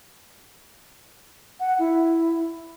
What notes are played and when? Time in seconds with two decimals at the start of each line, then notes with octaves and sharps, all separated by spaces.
1.60 F#5
1.79 E4